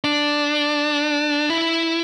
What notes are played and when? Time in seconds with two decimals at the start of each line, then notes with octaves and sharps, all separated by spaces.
0.04 D4
1.50 E4